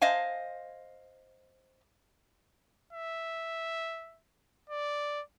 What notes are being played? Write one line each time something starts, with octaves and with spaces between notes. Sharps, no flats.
C5 D#5 F5 G#5
E5
D5